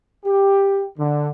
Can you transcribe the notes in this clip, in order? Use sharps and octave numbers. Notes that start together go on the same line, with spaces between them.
G4
D3